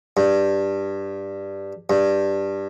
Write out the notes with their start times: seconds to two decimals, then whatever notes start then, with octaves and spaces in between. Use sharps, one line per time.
0.17 G2
1.90 G2